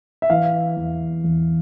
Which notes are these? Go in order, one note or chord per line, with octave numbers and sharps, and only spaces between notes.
E5
E3 F5
E2
E2